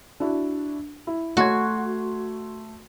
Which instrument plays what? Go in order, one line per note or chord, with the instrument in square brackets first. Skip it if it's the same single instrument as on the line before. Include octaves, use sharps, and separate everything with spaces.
[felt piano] D4 E4 F#4
E4
[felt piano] A3 C6 G#6 [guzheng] F#4